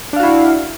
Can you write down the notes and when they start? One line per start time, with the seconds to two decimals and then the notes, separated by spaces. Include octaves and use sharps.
0.13 D4
0.16 F5
0.20 F#4
0.23 E4